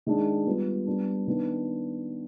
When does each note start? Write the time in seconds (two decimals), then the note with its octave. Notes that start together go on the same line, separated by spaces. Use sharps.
0.06 D#3 G#3 D4 G#4
0.46 G3 B3 F4
0.86 G3 B3 D4
1.27 D#3 B3 D4